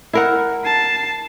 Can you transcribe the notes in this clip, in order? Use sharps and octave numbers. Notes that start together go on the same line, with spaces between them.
E4 A#4 F#5
A5 C7